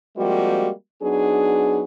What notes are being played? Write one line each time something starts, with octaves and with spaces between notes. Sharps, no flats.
F3 G3 G#3 A#3 C4 F#4
F#3 B3 D4 D#4 G#4